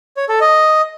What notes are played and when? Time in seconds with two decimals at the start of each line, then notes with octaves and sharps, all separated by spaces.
0.17 C#5
0.29 A4
0.41 D#5